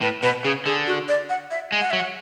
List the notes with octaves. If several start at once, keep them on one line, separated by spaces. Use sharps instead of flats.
A2 B4
B2 B4
C#3 G#4
D3 G#4
F#4
D5
F#5
E5
G#3
F#5
F#3 E5
F#5